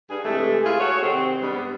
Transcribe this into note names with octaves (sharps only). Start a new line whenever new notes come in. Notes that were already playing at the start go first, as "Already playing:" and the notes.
G2 G#4
C3 E3 G#3 A3
E4 F4 G#4
F#4 A4 C#5
C3 D#3 C4
G2 G3 G#3 B3